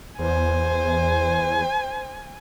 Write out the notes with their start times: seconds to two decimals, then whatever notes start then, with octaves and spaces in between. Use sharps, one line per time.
0.19 E2 C5 G#5